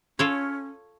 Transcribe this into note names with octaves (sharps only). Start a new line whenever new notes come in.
C#4 F4 A4 C#5